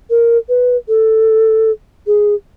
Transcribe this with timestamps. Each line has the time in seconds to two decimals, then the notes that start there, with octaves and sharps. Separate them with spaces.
0.10 A#4
0.49 B4
0.88 A4
2.07 G#4